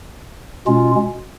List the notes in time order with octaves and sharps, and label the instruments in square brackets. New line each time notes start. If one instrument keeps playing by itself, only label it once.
[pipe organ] B2 G#3 C#4 F4